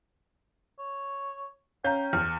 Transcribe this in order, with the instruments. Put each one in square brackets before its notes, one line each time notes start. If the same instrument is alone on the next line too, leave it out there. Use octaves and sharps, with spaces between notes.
[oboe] C#5
[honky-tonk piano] C#4 F5 G6 [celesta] C#5 A#5 [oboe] G5
[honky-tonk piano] E2 [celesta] F6